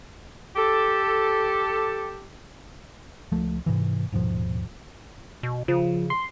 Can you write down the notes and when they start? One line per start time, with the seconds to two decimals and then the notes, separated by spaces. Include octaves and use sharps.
0.56 G4 A4
3.32 C#2 F3 A3
3.66 G#2 C3 E3
4.12 D#1 G#2 B2 F3
5.43 B2
5.68 C#3 F3
6.10 C6